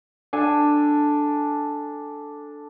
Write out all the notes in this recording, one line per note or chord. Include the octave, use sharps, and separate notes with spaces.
D4 A4 D5 G#5